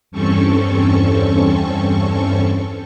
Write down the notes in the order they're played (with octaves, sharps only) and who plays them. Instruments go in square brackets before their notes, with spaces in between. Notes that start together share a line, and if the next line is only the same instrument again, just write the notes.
[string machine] E2 G2 C4 C#4 A4 C#6